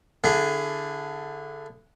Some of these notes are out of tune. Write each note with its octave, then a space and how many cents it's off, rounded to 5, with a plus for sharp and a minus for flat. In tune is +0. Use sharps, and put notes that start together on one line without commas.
D3 +0 E4 +30 G#4 +0